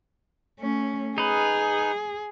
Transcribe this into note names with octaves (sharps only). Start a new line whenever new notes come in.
A3 C#4
D#4 G#4 B4